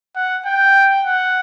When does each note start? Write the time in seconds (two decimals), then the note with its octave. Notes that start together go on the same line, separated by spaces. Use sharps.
0.16 F#5
0.45 G5
1.04 F#5